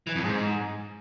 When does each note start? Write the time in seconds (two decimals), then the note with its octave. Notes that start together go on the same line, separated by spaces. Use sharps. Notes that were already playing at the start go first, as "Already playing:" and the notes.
0.07 E3
0.15 F2
0.24 G#2